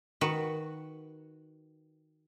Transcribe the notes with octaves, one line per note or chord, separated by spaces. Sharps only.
D#3 F#4 B4